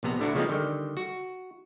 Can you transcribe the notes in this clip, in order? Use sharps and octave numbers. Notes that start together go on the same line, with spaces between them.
A#1 C3 B3 A#5
D2 D3 D4 E4 F#4
C#3 F3 G#3 B3 C4 D#4
D3 D#3 G3 G5
F#4